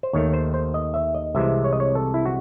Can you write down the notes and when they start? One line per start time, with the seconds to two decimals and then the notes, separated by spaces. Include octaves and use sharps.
0.03 C5
0.13 D#2 D#3 A3 C#5
0.33 C5
0.54 C5
0.74 D#5
0.94 E5
1.14 D#5
1.35 C2 C3 E3 G#3 E5
1.64 C#5
1.73 D#5
1.80 C#5
1.95 A4
2.14 E4
2.25 F#4